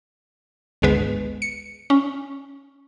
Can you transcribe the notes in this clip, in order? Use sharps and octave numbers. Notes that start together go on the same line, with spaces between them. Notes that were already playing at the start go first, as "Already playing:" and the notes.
G#1 D2 G#3 B3 B4
C#7
C#4